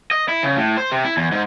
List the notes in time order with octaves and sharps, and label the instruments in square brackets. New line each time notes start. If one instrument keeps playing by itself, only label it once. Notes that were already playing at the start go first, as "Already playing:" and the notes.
[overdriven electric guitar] D#5
E4
C#3
A2
C5
C3
E4
E2
G#2